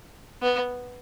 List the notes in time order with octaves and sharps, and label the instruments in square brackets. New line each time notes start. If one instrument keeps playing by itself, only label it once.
[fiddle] B3